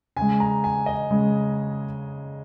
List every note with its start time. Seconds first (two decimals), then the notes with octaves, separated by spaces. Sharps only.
0.16 C#3 G#3 G#5
0.40 A#5
0.64 G#5
0.86 D#5
1.11 C#3 G#3